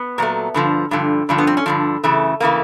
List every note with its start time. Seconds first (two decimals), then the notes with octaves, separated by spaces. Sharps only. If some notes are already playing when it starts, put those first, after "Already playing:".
Already playing: B3
0.18 A#2 F#3 A3
0.54 G2 D3 F3
0.91 G2 D3 F3
1.29 G2 D3 F3
1.38 B3
1.47 C4
1.57 C#4
1.66 G2 D3 F3
2.04 F#2 C#3 E3 A3
2.40 C#3 E3 A3 A#3